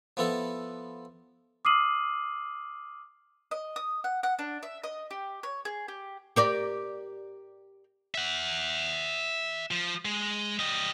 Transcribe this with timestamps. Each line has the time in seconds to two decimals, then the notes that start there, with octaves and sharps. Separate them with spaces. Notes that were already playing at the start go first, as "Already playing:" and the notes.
0.17 F3 B3 E4 A4
1.65 D6 D#6 F6 C7 D#7 F#7
3.51 D#5
3.76 D#6
4.04 F#5
4.23 F#5
4.39 D4
4.63 E5
4.84 D#5
5.11 G4
5.43 C#5
5.65 G#4
5.88 G4
6.36 G4 A#4 D5
8.15 E5 F#5
9.71 F3
10.05 G#3
10.59 G3 D#5